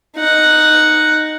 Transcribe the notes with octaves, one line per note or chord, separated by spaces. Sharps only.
D#4 F#5